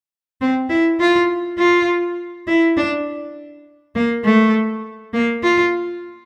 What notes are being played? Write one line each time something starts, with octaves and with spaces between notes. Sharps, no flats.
C4
E4
F4
F4
E4
D4
A#3
A3
A#3
F4